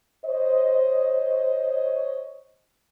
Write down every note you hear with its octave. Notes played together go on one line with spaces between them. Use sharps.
C5 C#5 D#5